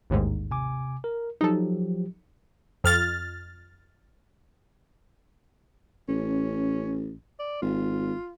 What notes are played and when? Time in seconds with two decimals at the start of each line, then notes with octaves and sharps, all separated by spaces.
0.10 A1 D#2 G#2
0.51 C3 G#5 D6
1.04 A#4
1.41 F3 F#3 D#4 G4 A4
2.84 F2 F6 A6
6.08 A1 C#4
7.39 D5
7.62 G#1 F4